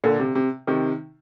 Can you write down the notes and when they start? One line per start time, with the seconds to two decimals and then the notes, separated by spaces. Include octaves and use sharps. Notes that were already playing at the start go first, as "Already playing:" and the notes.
0.04 A#2 D3
0.20 C3
0.35 C3
0.67 C3 D#3